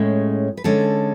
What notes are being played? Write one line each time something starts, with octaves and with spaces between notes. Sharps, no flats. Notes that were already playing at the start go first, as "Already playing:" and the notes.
Already playing: A2 G#3 C#4
B4
D3 G#3 C#4 A4